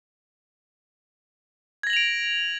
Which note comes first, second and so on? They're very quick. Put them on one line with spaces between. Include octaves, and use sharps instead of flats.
G#6 A#6 F#7 F7 D7